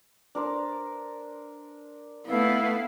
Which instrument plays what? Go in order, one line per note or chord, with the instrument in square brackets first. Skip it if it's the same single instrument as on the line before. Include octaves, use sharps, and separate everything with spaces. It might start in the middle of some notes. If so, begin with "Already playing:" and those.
[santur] D4 A#4 C5
[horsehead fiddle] A3 B3 [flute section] E4 B4 F5